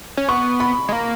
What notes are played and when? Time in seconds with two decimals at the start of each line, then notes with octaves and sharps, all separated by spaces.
0.17 C#4
0.29 B3 C#6
0.60 B5
0.89 G#3
0.92 A#3